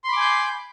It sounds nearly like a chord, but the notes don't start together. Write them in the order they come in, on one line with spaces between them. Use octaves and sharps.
C6 B5 D6 G#5 G6